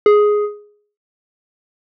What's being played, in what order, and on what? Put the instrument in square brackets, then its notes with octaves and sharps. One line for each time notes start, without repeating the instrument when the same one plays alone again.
[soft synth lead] G#4